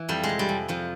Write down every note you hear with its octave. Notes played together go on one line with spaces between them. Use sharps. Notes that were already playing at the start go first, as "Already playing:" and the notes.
Already playing: E3
F2 G3
G#3
C3
G3
F2
F2 F3